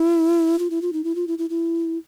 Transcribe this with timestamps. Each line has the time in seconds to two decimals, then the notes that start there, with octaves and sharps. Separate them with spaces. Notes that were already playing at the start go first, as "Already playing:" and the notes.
Already playing: E4
0.59 F4
0.70 E4
0.82 F4
0.93 D#4
1.04 E4
1.15 F4
1.27 E4
1.38 E4
1.50 E4